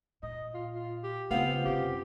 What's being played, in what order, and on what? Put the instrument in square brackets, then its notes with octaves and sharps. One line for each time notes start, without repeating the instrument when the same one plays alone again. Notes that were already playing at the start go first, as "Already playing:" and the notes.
[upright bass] A#2 [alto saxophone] D#5
[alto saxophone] F4
F4
G4
[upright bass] C#3 [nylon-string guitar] B3 C4 F4 [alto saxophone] F5
[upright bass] F#2 C3 [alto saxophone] G4